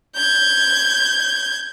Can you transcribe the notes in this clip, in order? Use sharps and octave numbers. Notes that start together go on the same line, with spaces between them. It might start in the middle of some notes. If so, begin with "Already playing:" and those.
G6 G#6